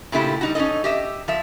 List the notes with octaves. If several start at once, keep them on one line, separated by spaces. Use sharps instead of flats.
A#2 C#3 A3 E4 G4
G3 D#4 F#4
C#4 D#4 A4 D#5
G4 D#5 E5
F3 E5